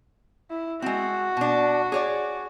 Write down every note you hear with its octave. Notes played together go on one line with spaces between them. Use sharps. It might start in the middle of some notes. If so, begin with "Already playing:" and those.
E4
G#3 C4 F#4
B2 D4
G#4 C#5 D5